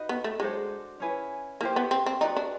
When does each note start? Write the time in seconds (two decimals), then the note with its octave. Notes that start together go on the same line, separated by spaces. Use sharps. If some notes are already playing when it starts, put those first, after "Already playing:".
Already playing: D#4 F#4 B4 D#5
0.09 B3
0.24 A3
0.40 G#3 D4 F#4 A4 C5
1.00 C#4 E4 G#4 B4
1.61 A#3 E4 G4 C5
1.76 B3
1.91 C4
2.06 C4
2.21 D#4 F#4 B4 D5 G5
2.36 D4